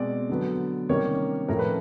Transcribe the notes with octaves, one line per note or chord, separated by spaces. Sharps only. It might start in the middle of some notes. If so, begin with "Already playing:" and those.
Already playing: B2 G#3 C4 D5
D3 F#3 B3
C3 D#3 G3 A#3 C#4 C#5
A2 F3 A3 C#4 A#4
B4